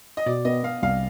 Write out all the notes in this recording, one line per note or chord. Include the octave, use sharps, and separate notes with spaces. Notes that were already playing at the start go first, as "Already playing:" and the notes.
D#5
B2 D5
B3 D#5
B3 F5
C2 F5